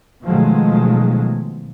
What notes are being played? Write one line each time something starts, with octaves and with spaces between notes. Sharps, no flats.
B2 D#3 F3 F#3 G#3 A3